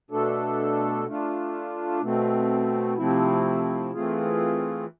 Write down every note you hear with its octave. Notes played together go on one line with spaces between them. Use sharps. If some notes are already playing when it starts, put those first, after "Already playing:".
B2 A3 D4 A4
A3 D4 F4
B2 A3 C4
C3 F3 A3 C4 E4
E3 A3 C4 F4 G#4